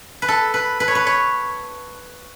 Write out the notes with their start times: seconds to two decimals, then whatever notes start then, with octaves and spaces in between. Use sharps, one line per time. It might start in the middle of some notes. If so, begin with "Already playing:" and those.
0.22 B4
0.28 A4
0.54 B4
0.80 B4
0.88 C#5
0.95 B4
1.07 C#5